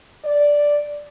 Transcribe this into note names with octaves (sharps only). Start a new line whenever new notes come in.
D5